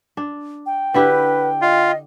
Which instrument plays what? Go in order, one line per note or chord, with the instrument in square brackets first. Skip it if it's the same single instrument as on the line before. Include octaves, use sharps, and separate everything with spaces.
[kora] D4
[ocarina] G5
[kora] D3 E4 G4 [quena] B4
[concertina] F4 [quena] D#5